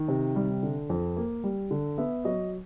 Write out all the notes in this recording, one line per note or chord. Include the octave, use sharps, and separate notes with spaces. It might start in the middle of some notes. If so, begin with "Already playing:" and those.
Already playing: D#3
C3
G3
D3
F2
A#3
G3
D3
B3 E5
F#3 D#5